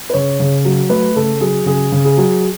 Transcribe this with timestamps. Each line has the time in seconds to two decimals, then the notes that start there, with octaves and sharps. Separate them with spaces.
0.10 B4
0.13 C#3 C#5
0.40 C#3
0.65 F#3
0.90 A3 B4
1.16 C#3 A4
1.41 F#3 G#4
1.66 C#3 G#4
1.92 C#3
2.05 G#4
2.17 F#3